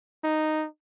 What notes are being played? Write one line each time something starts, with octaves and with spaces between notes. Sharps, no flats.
D#4